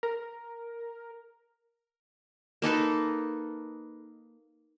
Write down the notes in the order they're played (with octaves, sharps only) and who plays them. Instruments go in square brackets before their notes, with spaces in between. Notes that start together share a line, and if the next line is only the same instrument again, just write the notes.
[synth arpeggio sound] A#4
[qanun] A#3 D#4 A4 B4